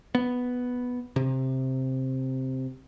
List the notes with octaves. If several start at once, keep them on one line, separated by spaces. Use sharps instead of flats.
B3
C3